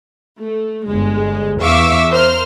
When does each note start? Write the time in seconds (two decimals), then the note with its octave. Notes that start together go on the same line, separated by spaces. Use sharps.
0.41 A3
0.89 G1 G#3
1.62 E2 E5 F5 C#6 D6 E6
2.10 A#4 C5 F6